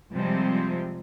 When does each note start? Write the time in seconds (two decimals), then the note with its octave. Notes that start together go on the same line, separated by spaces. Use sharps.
0.13 C3 F3 G3 G#3 C4